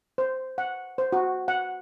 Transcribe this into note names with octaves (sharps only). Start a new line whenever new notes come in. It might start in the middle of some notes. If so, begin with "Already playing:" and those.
C5
F#5
C5
F#4
F#5